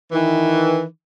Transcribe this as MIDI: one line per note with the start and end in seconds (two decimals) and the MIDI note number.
0.12 0.83 51
0.12 0.83 52